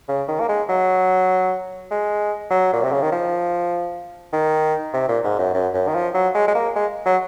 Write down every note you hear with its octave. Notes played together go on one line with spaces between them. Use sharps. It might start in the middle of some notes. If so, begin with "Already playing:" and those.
C#3
D#3
A#3
G#3
F#3
G#3
F#3
A#2
C3
C#3
D#3
F3
D#3
C3
A#2
G#2
F#2
F#2
F#2
D#3
F3
F#3
G#3
G#3
A#3
G#3
F#3